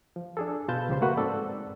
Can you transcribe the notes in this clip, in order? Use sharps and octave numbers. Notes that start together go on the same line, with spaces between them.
F3
D4 G#4 A4
B2 F4 B4 A5 G6
C#2 C#3 F3 G4 C5 C6
A3 A#3 F#4 B4 F#5
G#2 C4 A4 D5